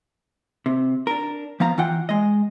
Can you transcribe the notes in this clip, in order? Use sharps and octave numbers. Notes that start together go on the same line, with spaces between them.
C3
D4 A#4
F3 B3 F5 A#5
E3 F4 F#5 G5
G#3 D#5